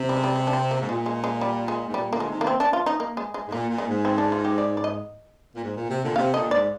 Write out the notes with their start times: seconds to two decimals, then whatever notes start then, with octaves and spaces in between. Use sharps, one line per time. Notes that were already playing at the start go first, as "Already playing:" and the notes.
Already playing: C3
0.09 G3
0.17 G#3
0.24 G3
0.36 G#3
0.47 D4
0.53 C4
0.71 A#3
0.81 G#2
0.89 A#2 G#3
1.06 G#3
1.24 G#3
1.41 G3
1.68 G#3
1.88 G#2
1.94 A#2 G3
2.11 A#2 D3 A#3
2.20 G#3
2.29 C3 D#3
2.41 A#3
2.47 C4
2.60 D4
2.73 F4
2.86 D#4
3.00 A#3
3.17 G#3
3.34 G#3
3.48 G#2
3.52 A#2 A#3
3.70 A#2
3.78 G#3
3.87 G#2
4.05 C4
4.18 D4
4.32 F4
4.45 G4
4.58 D5
4.77 D5
4.84 D#5
5.55 A#2
5.63 G#2
5.76 A#2
5.89 C3
6.03 A#2 D3
6.16 C3 F5
6.34 A#2 D3 D#5
6.51 G#2 D5